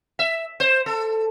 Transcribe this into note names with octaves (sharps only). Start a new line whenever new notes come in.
E5
C5
A4